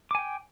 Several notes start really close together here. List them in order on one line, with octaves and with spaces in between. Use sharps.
D6 G#5 G5